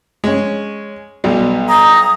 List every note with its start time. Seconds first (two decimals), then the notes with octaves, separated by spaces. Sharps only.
0.24 G#3 C#4
1.24 B1 B2 G3
1.69 A#5 D#6